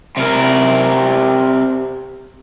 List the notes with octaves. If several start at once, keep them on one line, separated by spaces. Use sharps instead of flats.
C3 A#4